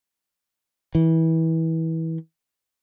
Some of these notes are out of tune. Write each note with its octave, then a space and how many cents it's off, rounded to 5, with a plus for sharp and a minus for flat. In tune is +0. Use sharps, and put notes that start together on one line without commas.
E3 -25